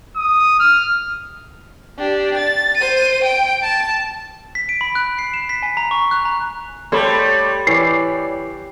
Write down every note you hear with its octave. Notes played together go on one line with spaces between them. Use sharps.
D#6
F6
D4 G4
A6
C5 D#7
G5 D7
A5
B6
D7
B5
F#6
C7
E7
B6
G#5
A#5
C#6
F#6
A#5
G3 A3 C5 C#5 B5 C#6
E3 C#5 D5 C7